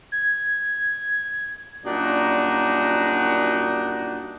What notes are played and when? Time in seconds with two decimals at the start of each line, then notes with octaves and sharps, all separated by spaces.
0.12 G#6
1.85 F#2 A#2 G3 D4 D#4 F#4